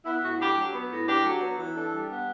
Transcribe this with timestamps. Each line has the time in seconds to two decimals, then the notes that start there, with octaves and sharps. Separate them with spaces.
0.05 B3 E4
0.22 A2 F#4
0.39 D4 G4
0.57 F#3
0.74 B3
0.90 A2
1.07 D4 G4
1.25 F#3
1.41 B3
1.58 E3
1.75 D4 A4
1.92 G3
2.10 B3